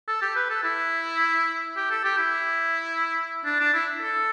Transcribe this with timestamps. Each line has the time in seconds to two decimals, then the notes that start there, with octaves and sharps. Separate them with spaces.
0.08 A4
0.22 G4
0.36 B4
0.50 A4
0.64 E4
1.77 G4
1.91 A4
2.04 G4
2.19 E4
3.45 D4
3.60 D4
3.74 E4
4.02 A4